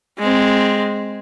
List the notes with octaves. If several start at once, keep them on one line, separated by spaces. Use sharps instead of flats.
G#3 C4